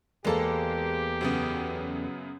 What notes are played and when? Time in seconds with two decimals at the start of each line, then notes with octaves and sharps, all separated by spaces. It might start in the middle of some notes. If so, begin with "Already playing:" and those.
0.25 E2 G#3 A#3 G4 A4 A5
1.21 F#2 C#3 B3